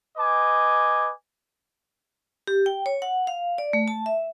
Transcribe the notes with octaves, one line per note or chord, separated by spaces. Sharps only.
B4 D#5 G#5 D6
G4
G5
C#5
F#5
F5
D5
A3
A5
E5